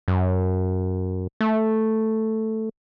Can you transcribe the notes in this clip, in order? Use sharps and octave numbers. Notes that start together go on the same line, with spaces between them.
F#2
A3